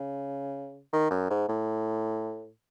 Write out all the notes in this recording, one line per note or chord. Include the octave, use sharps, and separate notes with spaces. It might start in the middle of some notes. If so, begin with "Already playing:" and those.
Already playing: C#3
D#3
F#2
G#2
A2